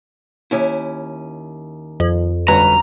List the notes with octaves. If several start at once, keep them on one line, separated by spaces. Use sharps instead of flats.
D#2 C#4 E4
F2
G1 F#3 C#4 F#4 B4 A#5